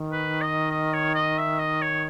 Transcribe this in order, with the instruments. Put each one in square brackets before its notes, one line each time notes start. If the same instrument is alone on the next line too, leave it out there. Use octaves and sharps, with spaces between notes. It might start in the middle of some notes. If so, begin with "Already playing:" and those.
Already playing: [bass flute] D#3
[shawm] B4
D#5
D#5
C#5
D#5
E5
D#5
C#5